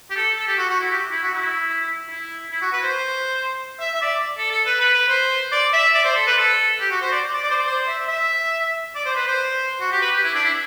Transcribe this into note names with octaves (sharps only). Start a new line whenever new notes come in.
G4
A4
A4
G4
F#4
F#4
E4
G4
E4
F#4
E4
E4
E4
F#4
B4
C5
E5
E5
D5
A4
A4
B4
B4
B4
C5
D5
E5
D5
C5
A4
B4
A4
G4
F#4
C5
D5
D5
D5
C5
D5
C5
E5
E5
D5
C5
B4
C5
F#4
G4
B4
G4
E4
D4
E4